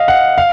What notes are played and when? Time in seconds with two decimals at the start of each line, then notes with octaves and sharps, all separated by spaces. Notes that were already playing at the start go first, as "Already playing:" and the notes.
Already playing: D#5 F5
0.08 F#5
0.38 F5